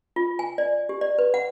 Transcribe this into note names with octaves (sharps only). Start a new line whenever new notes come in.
F4
G#5
D5
G4
D5
B4
F#5